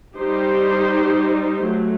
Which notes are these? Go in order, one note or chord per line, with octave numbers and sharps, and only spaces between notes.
G3 D#4 G4 C5
F#3 A3